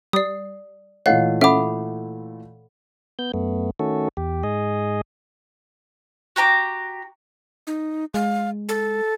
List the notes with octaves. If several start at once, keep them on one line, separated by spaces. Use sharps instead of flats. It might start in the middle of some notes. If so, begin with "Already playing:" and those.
G3 D5 D#6 C7
A#2 E3 A3 C#5 D#5 F5 F#5
C#4 A4 E5 F#5 B5 D6
B3 G6
F#2 A3 B3
D#3 A3 C#4 F#4 A4
E2 G4
G#2 G#4 D#5
F#4 G4 A#5 D6
D#4
G#3 F5
A4